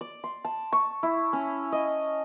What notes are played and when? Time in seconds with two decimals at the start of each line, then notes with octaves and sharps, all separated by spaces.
0.01 D5
0.24 C6
0.45 A5
0.73 C#6
1.03 E4
1.33 C#4
1.72 D#5